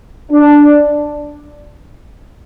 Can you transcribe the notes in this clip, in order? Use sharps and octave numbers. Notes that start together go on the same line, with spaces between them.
D4